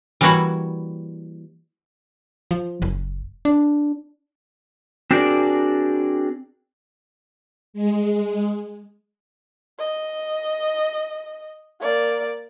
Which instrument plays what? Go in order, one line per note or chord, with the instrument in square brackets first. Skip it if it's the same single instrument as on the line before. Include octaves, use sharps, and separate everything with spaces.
[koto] E3 G3 A#3 E4 F#4 C#5
[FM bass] F3
F#1
D4
[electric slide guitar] C4 D4 F#4 G#4 A#4 D5
[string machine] G#3
[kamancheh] D#5
A#3 D5